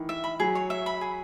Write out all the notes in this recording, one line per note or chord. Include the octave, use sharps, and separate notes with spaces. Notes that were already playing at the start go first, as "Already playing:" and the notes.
Already playing: D#3 E3
E5
B5
F#3 G#4
C#5
E5
B5
G#4